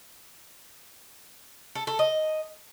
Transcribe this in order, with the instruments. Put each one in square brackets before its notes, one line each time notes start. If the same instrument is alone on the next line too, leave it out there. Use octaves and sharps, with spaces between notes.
[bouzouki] A4
A4
D#5